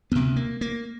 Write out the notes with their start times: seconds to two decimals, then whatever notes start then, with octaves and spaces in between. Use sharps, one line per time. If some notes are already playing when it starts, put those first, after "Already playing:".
0.12 D2 C3 B3
0.36 A#3
0.61 A#3